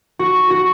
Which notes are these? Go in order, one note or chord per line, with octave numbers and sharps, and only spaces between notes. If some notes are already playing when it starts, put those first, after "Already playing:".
F#4
F#4